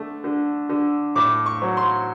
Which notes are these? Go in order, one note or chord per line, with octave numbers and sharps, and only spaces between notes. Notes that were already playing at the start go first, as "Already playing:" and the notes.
Already playing: D3 A3
D3
D3
A2 D6
C#6
F#3
C6